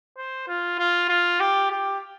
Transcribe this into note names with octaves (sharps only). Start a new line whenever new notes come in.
C5
F4
F4
F4
G4
G4